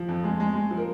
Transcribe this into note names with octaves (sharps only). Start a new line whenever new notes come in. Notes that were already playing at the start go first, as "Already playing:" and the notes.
Already playing: F3
F2
G#3
G#3
G#3
F3
A#4